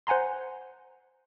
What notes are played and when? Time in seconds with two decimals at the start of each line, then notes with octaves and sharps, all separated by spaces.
0.07 C5 F#5 G#5 A#5 C6